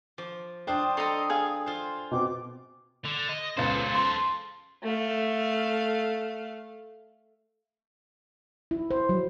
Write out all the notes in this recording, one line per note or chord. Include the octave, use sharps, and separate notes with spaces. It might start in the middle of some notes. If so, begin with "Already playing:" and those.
F3 D6
D4 F4 C5 G5 D#6
A4 D#5 A#5 C6
G#4 F5
F4 C5
B2 C4 D6
D3
D#5
C#2 B3 C#4 A4 C5
C6
A3 F5
E4
C5
F#3